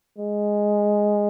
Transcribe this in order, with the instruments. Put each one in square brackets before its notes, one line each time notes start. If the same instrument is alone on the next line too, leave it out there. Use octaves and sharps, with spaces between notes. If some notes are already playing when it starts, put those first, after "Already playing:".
[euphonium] G#3